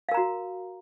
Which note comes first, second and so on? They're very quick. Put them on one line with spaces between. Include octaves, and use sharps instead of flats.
F5 A#4 A#5 F#4